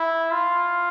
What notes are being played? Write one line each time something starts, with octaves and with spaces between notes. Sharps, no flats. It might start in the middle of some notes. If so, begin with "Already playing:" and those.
Already playing: E4
F4